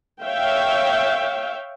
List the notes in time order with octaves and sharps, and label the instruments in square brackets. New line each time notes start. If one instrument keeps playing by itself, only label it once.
[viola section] C#5 E5 F5 G5